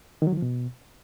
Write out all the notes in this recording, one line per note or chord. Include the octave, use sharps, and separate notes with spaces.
D#3
F#3
D#3
F3
B2